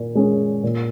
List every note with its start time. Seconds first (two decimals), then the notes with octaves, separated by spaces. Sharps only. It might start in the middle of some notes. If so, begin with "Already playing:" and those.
Already playing: A#2
0.15 G#3 C#4
0.63 A#2